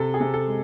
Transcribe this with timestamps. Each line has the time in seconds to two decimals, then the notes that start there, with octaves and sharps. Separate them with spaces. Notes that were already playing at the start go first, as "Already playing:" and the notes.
Already playing: C3 A4
0.14 G#4
0.21 C3
0.34 A4
0.47 G#3